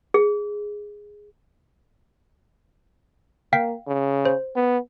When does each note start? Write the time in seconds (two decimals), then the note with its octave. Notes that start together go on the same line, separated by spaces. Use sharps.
0.14 G#4
3.53 A#3 F5 G5 B6
3.88 C#3
4.25 C5
4.56 B3